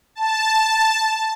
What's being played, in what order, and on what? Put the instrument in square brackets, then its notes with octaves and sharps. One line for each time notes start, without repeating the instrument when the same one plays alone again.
[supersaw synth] A5